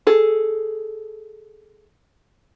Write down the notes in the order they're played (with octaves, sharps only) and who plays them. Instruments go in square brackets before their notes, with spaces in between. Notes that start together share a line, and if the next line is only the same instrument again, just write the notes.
[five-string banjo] G#4 A4